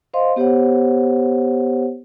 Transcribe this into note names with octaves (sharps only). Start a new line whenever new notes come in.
C5 D#5 F5 C6
B3 G4 C5 C#5 F#5